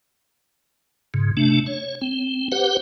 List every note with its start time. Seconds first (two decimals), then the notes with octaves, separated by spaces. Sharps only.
1.14 G#2 C#3
1.37 C3 A3 D4
1.66 C#5
2.01 C4
2.52 G4 B4 C5 F#5